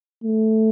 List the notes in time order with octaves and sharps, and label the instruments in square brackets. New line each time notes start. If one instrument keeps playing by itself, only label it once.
[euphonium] A3